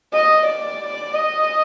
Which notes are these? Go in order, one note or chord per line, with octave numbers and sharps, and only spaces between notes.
D#5
D5
D#5